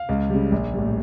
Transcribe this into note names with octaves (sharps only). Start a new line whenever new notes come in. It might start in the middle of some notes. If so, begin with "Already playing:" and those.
Already playing: F5
C#2
C#3 G3
A#1
A2 G3